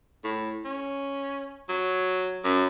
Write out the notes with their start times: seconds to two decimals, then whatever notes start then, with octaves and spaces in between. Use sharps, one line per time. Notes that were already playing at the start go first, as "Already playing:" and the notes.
0.24 A2
0.65 C#4
1.69 F#3
2.45 F#2